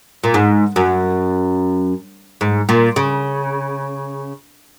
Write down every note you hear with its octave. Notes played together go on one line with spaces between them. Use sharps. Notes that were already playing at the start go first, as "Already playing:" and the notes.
A#2
G#2
F#2
G#2
A#2
C#3